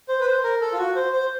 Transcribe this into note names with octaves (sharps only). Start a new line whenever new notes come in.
C5
B4
C5
A#4
A4
F4
F#4
C5
C5